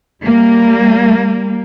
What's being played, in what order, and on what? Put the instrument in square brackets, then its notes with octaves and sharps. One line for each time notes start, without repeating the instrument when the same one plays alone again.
[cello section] G3 A#3